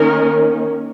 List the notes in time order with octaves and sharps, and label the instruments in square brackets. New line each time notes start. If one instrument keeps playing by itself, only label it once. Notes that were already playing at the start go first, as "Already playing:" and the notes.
Already playing: [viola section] D#3 A#3 C#4 A#4